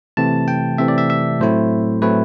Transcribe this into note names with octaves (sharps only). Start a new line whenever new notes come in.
C3 E3 A3 C4 A5
G5
C3 E3 A3 C4 E5
D5
E5
E5
A2 F#3 A3 C4 E4 C5
A2 F#3 A3 C4 E4 B4